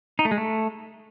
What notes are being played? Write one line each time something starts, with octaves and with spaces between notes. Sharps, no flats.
D#4
A3
G#3
A3